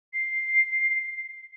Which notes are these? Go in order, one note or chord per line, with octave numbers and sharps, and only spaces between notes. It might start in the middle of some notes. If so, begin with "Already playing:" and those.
C7